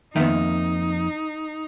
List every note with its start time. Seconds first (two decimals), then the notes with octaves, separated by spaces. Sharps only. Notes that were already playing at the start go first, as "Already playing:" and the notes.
0.16 F2 D#3 A#3 B3 D#4 E5